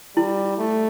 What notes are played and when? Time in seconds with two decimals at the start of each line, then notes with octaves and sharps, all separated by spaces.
0.16 G3 E4
0.58 A3